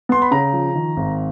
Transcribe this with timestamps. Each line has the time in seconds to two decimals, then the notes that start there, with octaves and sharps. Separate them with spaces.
0.09 B3 C6
0.22 B5
0.31 C#3 A#5
0.53 F3
0.75 D#3
0.97 G#1